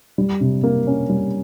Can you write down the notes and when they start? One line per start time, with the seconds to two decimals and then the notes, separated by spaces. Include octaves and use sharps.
0.18 G3
0.41 C3
0.63 A#3
0.87 C#4
1.09 G3